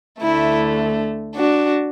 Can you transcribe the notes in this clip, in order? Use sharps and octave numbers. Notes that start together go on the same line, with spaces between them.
D2 D3 A3 E4
D4 F#4